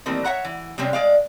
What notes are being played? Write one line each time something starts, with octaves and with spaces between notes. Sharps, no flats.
D#3 E3 G3 A3 A#3 C4
C#5 E5 F#5 A#5
E3
C3 G3 G#3 C4 C#4
G#3 D5 F5